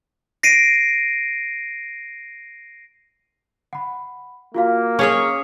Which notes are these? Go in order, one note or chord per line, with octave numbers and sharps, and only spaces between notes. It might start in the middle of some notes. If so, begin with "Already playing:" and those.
A#6 C7 D7 D#7
F#5 B5
A#3 F4 F#4 F5
C#4 G#4 C#5 C#6 G#6 C#7